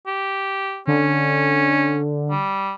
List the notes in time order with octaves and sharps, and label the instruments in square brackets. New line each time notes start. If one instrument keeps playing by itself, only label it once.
[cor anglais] G4
[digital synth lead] D3 [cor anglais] C#4
[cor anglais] G3